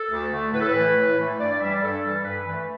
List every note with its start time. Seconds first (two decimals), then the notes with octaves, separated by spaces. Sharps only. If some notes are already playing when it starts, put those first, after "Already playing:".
Already playing: A4
0.10 D2
0.32 D3 A3
0.53 A2 B4
0.60 A4
0.68 B4
0.74 E3 A3
0.95 A2
1.18 E3 A3
1.39 G2 D5
1.50 D5
1.60 E3 G3 E5
1.71 D5
1.82 G2 A4
2.03 E3 G3
2.25 G2 B4
2.46 E3 A3